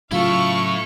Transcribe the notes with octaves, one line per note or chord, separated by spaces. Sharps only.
A2 C#3 F#3 E4 F4 A4 F5 C#6